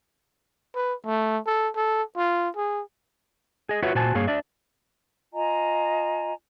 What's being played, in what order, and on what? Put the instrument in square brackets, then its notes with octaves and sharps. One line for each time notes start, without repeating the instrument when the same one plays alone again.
[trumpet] B4
A3
A4
A4
F4
G#4
[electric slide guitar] G#4 D#5
F4 F#4 B4 C#5 E5 F#5
A#2 F#4 C5 G#5 A5
G2 A#3 G#4 C#5 F5
D4 D5 E5
[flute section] F4 D#5 G#5 A#5